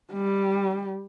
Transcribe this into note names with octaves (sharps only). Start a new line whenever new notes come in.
G3